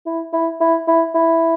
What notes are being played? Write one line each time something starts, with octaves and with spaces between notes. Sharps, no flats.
E4
E4
E4
E4
E4